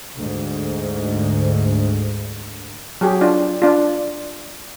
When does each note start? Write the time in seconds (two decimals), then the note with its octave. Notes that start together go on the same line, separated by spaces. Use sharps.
0.16 D2 G#2
3.01 F#3 G4 G#4
3.21 D4 F4
3.62 D4 F4